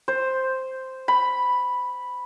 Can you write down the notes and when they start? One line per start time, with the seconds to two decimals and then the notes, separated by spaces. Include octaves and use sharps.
0.08 C5
1.08 B5